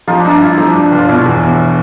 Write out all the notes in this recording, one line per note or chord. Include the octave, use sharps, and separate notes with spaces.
F3 D#4 F4
D4
G2 D#4
G2 E4
F3 D#4
G2 D4
D4
G1
F4
B2 E4
E2
E2